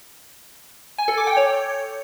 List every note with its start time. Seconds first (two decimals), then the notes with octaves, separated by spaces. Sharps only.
0.98 G#5
1.08 A4
1.18 D6
1.27 G5
1.37 C#5